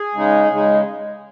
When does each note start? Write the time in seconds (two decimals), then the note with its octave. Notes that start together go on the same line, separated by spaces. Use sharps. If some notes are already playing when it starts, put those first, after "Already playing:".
Already playing: G#4
0.14 C#3 G#3 D#4
0.49 C#3 G#3 D#4